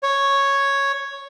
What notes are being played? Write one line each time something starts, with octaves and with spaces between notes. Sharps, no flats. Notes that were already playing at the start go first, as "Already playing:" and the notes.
C#5